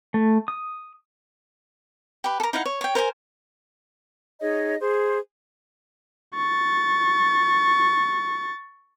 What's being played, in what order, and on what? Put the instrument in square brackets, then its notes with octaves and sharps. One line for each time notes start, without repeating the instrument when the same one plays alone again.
[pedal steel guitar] A3
D#6
[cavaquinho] G4 B4
A4 A#4
D#4 E4 F5 F#5
C#5
C#5 G5
A#4 C5 D5 G#5
[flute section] D#4 G#4 C#5 D#5
G#4 C5
[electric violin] C#6 A6